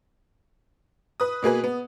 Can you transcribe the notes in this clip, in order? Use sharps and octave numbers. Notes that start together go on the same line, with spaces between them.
B4 D#6
B2 A#3 G#4 B4
B3